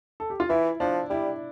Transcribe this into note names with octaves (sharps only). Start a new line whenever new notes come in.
A4
G4
F4
E3 E4
F3 D4
G3 E4